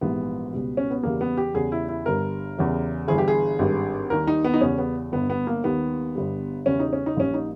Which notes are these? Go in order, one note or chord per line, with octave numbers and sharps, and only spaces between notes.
A#1 G#2 E3 G3 B3
C#2 B2 G3
C#4
B3
E2 C#3 E3 G3 A#3
B3
G4
E2 C#3 G3 G#4
E4
E4
G1 G2 G3 A#4
E2 C#3 E3 G3
G1 G2 E3 G3 G#4
G4
G#4
G#1 G2 G3
D#2 D#3 G3 A#4
D#4
B3
D#4
E2 C#3 G3 C#4
B3
G1 G2 G3 B3
B3
A#3
D#2 D#3 G3 B3
G1 G2 G3
E2 C#3 E3 G3 C#4
D#4
C#4
D#4
A#1 A#2 G3 C#4
D#4